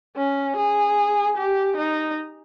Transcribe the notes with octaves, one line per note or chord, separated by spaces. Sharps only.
C#4
G#4
G4
D#4